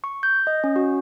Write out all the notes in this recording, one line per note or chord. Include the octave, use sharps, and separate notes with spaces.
C#6
G6
D#5
C#4
F#4